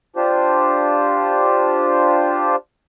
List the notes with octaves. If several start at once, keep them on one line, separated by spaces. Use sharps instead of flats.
D4 F4 G4 C5